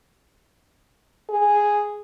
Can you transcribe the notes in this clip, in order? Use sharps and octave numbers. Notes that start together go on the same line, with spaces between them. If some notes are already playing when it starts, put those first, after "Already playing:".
G#4